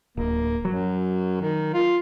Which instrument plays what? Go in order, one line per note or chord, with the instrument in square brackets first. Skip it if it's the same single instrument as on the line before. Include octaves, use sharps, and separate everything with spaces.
[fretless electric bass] D1 [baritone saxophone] A#3
[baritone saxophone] F#2 [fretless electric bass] F#3
[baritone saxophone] D#3
F4